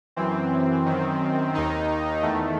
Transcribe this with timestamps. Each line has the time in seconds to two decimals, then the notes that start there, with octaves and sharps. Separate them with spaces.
0.16 F#2 E3 C4
0.86 F#2 D#3
1.54 D#2 D#3 D#4
2.22 E2 D#3 A3